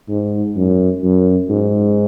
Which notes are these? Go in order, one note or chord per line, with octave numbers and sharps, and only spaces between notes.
G#2
F#2
F#2
G#2